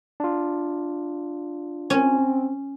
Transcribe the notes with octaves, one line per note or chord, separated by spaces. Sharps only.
D4 F4
C4 C#4